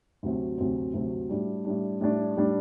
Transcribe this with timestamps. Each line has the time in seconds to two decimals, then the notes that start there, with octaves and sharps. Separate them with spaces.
0.23 D2 C3 F#3 C4
0.58 D2 C3 F#3 C4
0.93 D2 C3 F#3 C4
1.29 A2 G3 D4
1.65 A2 G3 D4
2.01 A2 G3 D4
2.36 A2 G3 D4